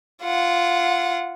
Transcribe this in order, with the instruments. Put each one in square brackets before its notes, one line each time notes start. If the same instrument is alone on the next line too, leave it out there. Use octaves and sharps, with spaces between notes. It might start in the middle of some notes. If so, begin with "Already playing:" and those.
[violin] F4 F#5